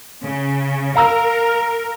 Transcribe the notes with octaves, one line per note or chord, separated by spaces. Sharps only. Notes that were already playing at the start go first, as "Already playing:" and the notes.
C#3
A#4 F5 A#5 E6